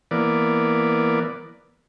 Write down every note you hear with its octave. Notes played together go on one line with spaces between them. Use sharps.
E3 A#3 B3 D5